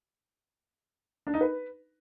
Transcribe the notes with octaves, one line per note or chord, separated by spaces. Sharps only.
D4
D#4
B4